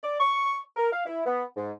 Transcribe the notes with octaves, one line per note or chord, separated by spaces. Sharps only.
D5
C#6
A#4
F5
E4
B3
G#2